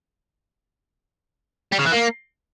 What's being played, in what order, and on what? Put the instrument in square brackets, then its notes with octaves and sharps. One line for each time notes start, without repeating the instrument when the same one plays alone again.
[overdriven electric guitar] G3
C#3
E3
A#3